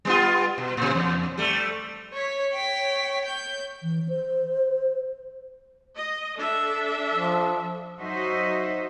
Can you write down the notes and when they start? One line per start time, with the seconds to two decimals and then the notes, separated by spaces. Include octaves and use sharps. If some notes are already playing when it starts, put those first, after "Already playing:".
0.05 G3 B3 F4
0.58 B2
0.77 A2 C3
0.95 E2
1.38 G3 A3
2.14 C#5 B6
2.54 C#5 G5 B6
3.25 G6
3.83 E3
4.09 C5
5.96 D#5
6.37 D4 A4 E5
7.13 F3
8.01 F#3 D#4 F#4 C5 D#5 E5